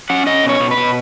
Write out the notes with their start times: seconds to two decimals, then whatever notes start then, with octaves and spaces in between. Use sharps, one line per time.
0.10 C#4 F#5
0.26 C#4 D#5
0.44 B2
0.49 C#5
0.60 B2
0.71 B4
0.77 B2